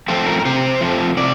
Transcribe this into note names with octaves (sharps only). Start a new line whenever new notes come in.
F3 A3 C4 F4
A#4
A#4
C3 C5
F3 A3 C4
C3 D5